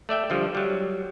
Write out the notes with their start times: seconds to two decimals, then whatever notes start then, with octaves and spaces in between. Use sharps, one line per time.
0.09 A3 D5 E5 G5
0.30 D3 F3 G3
0.55 F#3 G3